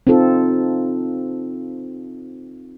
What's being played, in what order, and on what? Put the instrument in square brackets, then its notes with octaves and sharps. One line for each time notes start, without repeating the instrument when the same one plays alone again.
[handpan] C4 D#4 F4 A4